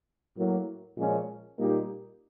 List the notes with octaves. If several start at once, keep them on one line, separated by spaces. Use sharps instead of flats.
A2 F#3 A#3
A#2 F3 G#3 C#4
A#2 G3 A#3 D#4 G4